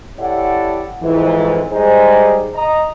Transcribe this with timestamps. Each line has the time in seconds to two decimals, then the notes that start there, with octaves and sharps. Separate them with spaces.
0.19 E4 G4 A4 C#5 D5 F#5
1.03 F2 G#2 E3
1.72 G3 G#3 D#4 G#4 C5
2.55 D#5 A#5